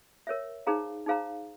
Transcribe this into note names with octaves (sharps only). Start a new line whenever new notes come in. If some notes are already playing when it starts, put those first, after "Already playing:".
A#4 C#5 E5
D#4 G#4 C5 F5 A#5
D#4 G#4 C5 F5 A#5